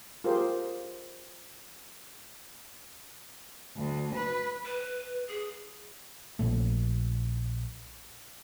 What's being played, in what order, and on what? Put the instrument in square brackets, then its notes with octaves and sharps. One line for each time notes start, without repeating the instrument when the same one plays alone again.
[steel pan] F4 G4 G#4 A#4 C5
[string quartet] D2
B4
[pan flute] B4
G#4
[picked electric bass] A#1 A#2 A3